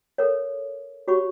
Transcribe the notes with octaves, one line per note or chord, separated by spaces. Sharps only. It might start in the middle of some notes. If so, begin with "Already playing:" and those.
A4 A#4 C#5
F#4 G4 C#5 B5 C#6